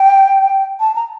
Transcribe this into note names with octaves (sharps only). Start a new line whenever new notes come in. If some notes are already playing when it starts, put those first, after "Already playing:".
Already playing: G5
A5
A#5